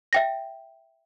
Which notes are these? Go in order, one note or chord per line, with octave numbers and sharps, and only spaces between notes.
E5 G5 A#6